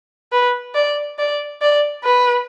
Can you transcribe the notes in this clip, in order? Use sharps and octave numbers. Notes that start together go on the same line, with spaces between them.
B4
D5
D5
D5
B4